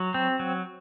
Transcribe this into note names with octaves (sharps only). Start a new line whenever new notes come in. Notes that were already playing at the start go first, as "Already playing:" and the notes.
Already playing: F#3
C4
F#3